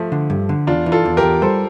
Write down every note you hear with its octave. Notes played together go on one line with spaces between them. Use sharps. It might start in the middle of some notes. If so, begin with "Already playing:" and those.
Already playing: F3 A3
D3
G2
D3
E2 D4 F4
E3
F4 A4
E2
G4 A#4
E2
G3 A4 C5